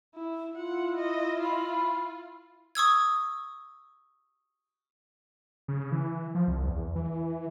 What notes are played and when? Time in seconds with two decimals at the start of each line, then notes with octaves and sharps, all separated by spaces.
0.15 E4
0.57 E4 F4 F#5
0.97 D#5
1.41 F4 B5
2.75 C#6 D#6 E6 G#6
5.68 C#3
5.92 E3
6.35 F3
6.48 C2
6.67 E2
6.96 E3